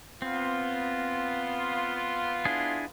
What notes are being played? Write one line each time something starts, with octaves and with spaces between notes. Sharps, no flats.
B3 C4 F4
D4 E4 G#4